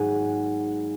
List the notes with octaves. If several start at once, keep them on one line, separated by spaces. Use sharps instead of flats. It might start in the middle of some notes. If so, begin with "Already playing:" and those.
Already playing: G#1 G#2 F#3 A#3 F#5 G#5